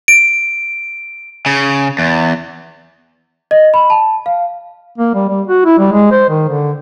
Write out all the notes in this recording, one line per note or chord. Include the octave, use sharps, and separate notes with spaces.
D7
C#3
E2
D#5
B5
A5
F5
A#3
G3
G3
F#4
E4
G3
G#3
C5
D#3
D3